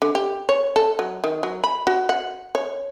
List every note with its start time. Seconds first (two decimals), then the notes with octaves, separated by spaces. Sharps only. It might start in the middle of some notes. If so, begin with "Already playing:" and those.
0.02 D3
0.15 G4
0.49 C#5
0.76 A4
0.99 F#3
1.24 D#3
1.43 F#3
1.64 B5
1.87 F#4
2.09 F#5
2.55 C#5